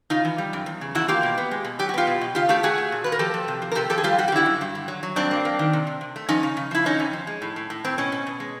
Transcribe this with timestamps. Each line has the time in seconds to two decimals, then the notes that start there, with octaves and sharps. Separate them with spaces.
0.10 C#3 D#4 F4
0.25 E3
0.38 G3
0.53 F#2
0.66 E2
0.81 C#3
0.95 E2 E4 F#4
1.08 A#3 F4 G4
1.23 B2
1.38 B3
1.51 G#3
1.64 B2
1.79 F#3 G4
1.89 F#4
1.94 B3 F4 G4
2.07 B2
2.21 B2
2.35 C#3 F4 G4
2.49 A3 F4 G4
2.63 A3 F#4 G#4
2.78 A3
2.92 A#2
3.04 A#2 B4
3.12 A#4
3.19 F3 G4 A4
3.34 F3
3.48 C3
3.62 F3
3.72 A#4
3.75 C3 G4 A4
3.89 F3 G4 A4
3.98 G#4
4.04 G3 F4 G4
4.18 G3 F#4
4.28 G4
4.32 D3 E4 F#4
4.46 F#2
4.61 G2
4.75 D3
4.88 F#3
5.03 F#3
5.16 G2 C4 D4
5.31 A#3
5.45 A#3
5.59 D#3
5.73 C3
5.87 C3
6.01 C3
6.16 A3
6.29 F3 C#4 D#4
6.43 C#3
6.57 C#3
6.71 F3 E4
6.85 D3 C#4 D#4
6.99 F2
7.13 F3
7.27 G#3
7.42 A2
7.56 A2
7.70 A2
7.84 A2 C4
7.98 B2 C#4
8.12 B2
8.27 B2
8.40 G#3